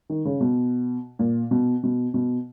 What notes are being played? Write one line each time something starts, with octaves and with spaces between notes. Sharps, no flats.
D#3
C#3
B2
A#2
B2
B2
B2